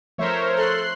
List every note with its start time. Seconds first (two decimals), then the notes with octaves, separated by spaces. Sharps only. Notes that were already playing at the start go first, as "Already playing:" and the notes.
0.18 F3 A3 A#4 C5 C#5 E5
0.57 A4 C6 F#6 C7